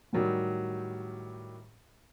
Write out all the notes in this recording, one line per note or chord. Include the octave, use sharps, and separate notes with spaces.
A2 D#3 F#3 G3 G4